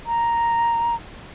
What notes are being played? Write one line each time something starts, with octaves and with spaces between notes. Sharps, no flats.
A#5